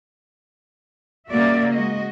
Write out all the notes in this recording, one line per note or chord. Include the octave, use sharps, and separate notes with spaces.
C#3 G3 A#3 F#4 D5 E5
G#3 F#4 D#5